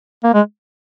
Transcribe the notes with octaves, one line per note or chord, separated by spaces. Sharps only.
A#3
G#3